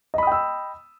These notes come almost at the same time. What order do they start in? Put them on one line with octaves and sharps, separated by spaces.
D#5 B5 D#6 G5 E6